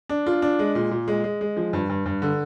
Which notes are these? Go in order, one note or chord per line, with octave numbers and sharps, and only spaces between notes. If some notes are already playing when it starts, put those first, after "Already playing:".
D4
F4
D4
G#3
A#2
A#2
G#3
G#3
G#3
F3
G2
G2
G2
D3